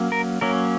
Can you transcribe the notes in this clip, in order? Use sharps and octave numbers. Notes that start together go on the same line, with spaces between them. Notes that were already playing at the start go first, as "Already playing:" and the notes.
Already playing: F#3 A#3 C#4
A#4
F#3 A#3 C#4 A#4